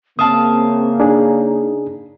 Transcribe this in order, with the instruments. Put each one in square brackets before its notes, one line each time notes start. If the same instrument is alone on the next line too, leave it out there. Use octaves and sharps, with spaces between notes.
[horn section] C#3 A#3 [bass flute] C4 [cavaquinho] E5 F5 A5 [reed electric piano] D#6
[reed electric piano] D4 G#4 [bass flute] D#4